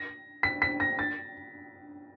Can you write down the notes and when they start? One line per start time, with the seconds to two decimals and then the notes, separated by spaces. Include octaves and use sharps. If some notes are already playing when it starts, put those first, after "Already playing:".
Already playing: A#6
0.43 B6
0.62 B6
0.80 A#6
0.99 A6